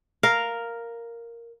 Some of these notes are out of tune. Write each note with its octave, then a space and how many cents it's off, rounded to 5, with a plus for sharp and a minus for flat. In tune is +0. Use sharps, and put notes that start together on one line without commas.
A#4 +0 F5 +0